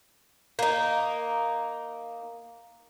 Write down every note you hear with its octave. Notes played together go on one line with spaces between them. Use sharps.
A#3 D#4